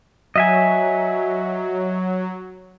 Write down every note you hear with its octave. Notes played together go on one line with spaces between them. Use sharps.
F#3 D#5 E5 G#5